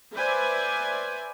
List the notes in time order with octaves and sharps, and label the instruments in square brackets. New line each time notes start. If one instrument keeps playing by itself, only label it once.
[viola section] B4 C5 D5 E5 G#5